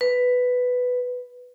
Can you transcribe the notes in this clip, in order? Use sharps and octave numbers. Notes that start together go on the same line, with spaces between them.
B4